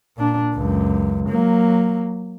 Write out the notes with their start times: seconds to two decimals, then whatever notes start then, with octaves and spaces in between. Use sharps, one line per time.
0.17 A#2 D4
0.54 C#2 F#2
1.29 F#3 A#3